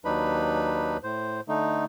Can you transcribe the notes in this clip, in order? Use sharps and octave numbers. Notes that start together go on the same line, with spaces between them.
D#2 F#3 D4 D#4 B4 B5
A2 C5
D3 A3 D#4